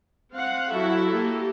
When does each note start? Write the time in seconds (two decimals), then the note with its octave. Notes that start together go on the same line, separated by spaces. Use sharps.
0.33 C4 F5 F#5
0.71 F#3 E4 F#4 A4 E5
1.09 A#3 G4 A4